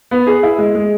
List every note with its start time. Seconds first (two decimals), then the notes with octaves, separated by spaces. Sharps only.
0.11 B3
0.27 G#4
0.43 E4
0.58 G#3
0.75 G#3